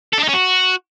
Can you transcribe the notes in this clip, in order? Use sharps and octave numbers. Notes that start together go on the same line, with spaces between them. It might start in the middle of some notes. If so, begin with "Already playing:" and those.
A4
D4
D#4
C#4
F#4